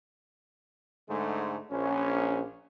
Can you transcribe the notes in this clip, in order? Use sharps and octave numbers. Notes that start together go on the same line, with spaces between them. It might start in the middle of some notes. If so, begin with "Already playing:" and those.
G#2 D3 G#3 A3
A#1 C#4